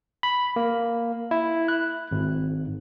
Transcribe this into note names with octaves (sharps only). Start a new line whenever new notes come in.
B5
A#3
E4
F#6
G#1